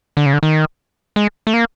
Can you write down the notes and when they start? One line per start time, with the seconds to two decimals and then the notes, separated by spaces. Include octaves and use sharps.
0.17 D3
0.26 C#3
0.33 D3
0.43 D#3
1.16 G#3
1.47 A3
1.54 A#3